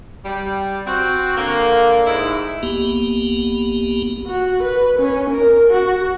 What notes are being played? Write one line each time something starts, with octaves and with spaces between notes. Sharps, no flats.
G3
C4 F#4
D3 A#3
G#2 E4
B1 A#3 B3 G4
F#4
B4
C#4
A#4
F#4